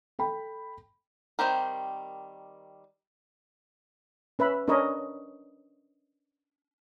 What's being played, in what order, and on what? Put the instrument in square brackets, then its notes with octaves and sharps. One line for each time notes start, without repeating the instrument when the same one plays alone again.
[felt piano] A4 G5 B5
[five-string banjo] D#3 G3 C4 G4 A#4
[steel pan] C#4 B4 E5 B5
C#4 D4 A#4 C#5 D#5 B5